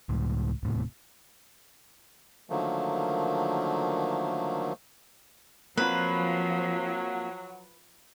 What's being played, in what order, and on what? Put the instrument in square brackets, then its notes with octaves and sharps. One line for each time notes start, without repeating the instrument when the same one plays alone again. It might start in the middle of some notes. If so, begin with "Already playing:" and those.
[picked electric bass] C#2 A2
D#1 A2 C3
[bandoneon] D3 D#3 F3 F#3 A3 A#3
[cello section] F3 [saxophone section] F#3 [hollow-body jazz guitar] A#3 C4 F4 [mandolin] B4